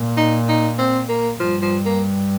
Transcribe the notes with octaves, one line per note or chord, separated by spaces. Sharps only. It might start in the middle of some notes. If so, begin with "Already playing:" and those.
Already playing: A#2
D#4
D#4
C4
A#3
G2 F3
F3
A#3